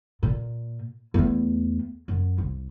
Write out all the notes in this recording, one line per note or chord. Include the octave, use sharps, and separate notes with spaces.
A#2
E2 A3
F#2
C2